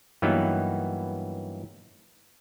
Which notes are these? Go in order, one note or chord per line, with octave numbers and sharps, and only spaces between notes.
G2 E3 F#3 A#3 B3 D#4